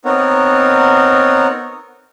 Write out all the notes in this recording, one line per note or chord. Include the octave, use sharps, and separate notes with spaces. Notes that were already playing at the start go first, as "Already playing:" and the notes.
B3 C4 D#4 A#4 C#5 F#5